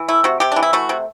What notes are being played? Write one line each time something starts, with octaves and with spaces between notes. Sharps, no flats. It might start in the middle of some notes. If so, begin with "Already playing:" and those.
Already playing: E3
A3 E4
C3 F#4
C3 G4
E3 D4
E4
A3 F#4
C3